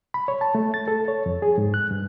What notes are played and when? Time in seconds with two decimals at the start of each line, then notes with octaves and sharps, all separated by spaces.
0.14 B5
0.28 C#5
0.41 A5
0.55 A3
0.74 A6
0.88 A4
1.08 C#5
1.26 F2
1.42 G#4
1.58 G#2
1.74 F#6
1.91 G2